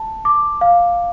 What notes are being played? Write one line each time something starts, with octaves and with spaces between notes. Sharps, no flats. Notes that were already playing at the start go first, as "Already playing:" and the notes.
Already playing: A5
D6
F5